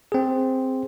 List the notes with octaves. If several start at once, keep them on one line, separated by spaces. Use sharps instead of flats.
C4 G#4